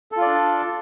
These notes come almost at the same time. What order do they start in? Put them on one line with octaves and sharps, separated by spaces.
A4 F4 D5 D4